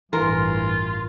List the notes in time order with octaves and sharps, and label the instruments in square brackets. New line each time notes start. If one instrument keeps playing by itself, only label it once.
[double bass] A1 G2 [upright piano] E3 C6 [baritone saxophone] F4 [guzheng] A#4